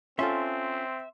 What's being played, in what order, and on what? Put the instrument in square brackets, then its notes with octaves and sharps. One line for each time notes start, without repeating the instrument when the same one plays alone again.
[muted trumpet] C4 [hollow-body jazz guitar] C#4 F4 A4 [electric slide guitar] E5 [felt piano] C6